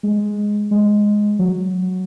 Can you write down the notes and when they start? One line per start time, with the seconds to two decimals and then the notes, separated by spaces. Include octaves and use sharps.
0.03 G#3
0.71 G#3
1.39 F#3